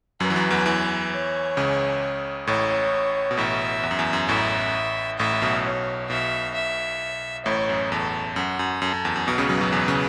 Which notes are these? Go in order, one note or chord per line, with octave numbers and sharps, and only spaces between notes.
F#2 F#3 B4
E3
F#2 F#3
E2 E3
E2 E3
C#5
C#2 C#3
A1 A2 C#5
B2
A1 A2 E5
E2
F#2
E2
F#2
A1 A2 E5
A1 A2 E5
A2
B1 B2
C#5
B1 B2 E5
E5
A1 A2 C#5
F#2
E2 A4
F#2 F#4
F#2
F#2 A4
F#2
E2
F#2
B1 B2 B4
C#2 C#3
F#2 F#3
F#2 F#3
E2 E3
C#3